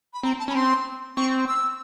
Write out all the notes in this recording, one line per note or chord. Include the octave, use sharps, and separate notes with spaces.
B5
C4 A#5
A5
C#4 B5
C4 C6
C4 C#6
E6